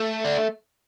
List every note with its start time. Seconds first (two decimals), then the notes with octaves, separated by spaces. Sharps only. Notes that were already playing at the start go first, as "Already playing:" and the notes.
Already playing: A3
0.24 D4